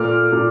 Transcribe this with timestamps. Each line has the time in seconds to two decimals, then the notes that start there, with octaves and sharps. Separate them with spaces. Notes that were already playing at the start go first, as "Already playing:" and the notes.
Already playing: A#2 A3 D6 F6
0.32 A#2